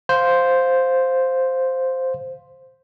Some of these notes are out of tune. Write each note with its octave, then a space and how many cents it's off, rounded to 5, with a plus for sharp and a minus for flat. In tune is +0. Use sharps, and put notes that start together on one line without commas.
C5 +0 F5 +10